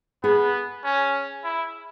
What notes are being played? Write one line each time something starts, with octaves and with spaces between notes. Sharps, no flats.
B3 G#4
C#4
E4